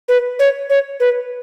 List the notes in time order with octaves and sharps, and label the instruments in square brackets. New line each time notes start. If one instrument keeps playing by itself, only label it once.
[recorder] B4
C#5
C#5
B4